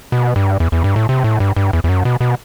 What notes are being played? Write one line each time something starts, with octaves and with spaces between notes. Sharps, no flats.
B2
G2
E2
E2
G2
A2
C3
A2
G2
G2
E2
E2
F#2
B2
B2